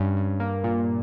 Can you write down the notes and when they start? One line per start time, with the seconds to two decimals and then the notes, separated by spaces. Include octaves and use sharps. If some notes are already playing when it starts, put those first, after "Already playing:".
Already playing: G2 C#4
0.17 G2
0.40 A#3
0.64 A#2